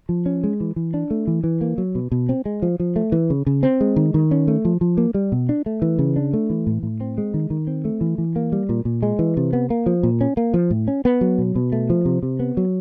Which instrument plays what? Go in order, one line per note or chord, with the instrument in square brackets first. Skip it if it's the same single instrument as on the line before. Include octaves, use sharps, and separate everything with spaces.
[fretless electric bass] F3
C#4
G#3
E3
E3
D4
A3
E3
E3
A#3
F#3
B2
B2
C4
G#3
F3
F3
A3
E3
C#3
C#3
C4
G#3
D#3
D#3
C#4
A3
F3
F3
A#3
G3
B2
D4
A3
E3
C#3
D4
A3
E3
A2
A2
C4
G#3
D#3
D#3
C4
A3
E3
E3
A#3
G3
A#2
A#2
G#3
E3
C3
B3
A#3
F3
A#2
C#4
A#3
F3
A2
C#4
B3
F#3
B2
B2
A3
F3
C3
C3
B3
F#3